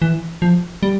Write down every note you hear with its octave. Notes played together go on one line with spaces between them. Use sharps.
E3
F3
G3